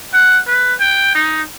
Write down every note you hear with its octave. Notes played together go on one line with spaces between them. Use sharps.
F#5
B4
G5
D#4